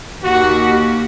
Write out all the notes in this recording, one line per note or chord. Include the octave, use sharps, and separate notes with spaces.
D#2 F#4 G4